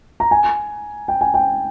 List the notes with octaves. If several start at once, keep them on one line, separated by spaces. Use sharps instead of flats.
A#5
G#5
G5
G#5
G5